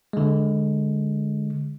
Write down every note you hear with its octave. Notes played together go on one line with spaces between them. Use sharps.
D3 G#3